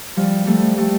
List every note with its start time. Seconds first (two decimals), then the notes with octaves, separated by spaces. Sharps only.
0.16 F3 G3
0.46 G3 A3
0.78 G3 A3